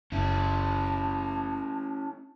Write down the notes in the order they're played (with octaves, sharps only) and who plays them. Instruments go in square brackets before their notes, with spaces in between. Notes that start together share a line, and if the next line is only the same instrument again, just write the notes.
[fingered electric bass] F#1 [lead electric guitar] C#4 E4 [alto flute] A5